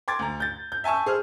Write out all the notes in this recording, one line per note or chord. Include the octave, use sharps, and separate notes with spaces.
G5 C6 D6 G#6 A6
D2 A#5
G6 A6
G6
E5 G#5 A5 C#6 E6
G#4 C5 F6